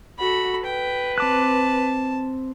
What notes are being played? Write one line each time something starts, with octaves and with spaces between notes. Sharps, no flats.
F#4 A4 B5
B4 G5
C4 A5 D6 F#6